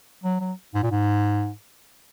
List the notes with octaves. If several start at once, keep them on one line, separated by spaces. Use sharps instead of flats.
F#3
F#3
G#2
A#2
G#2